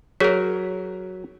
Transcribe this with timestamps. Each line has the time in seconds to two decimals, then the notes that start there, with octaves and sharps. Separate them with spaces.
0.20 F#3 G#4 A#4 C#5 B6